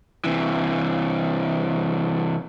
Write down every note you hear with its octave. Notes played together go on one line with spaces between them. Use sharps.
C3 E3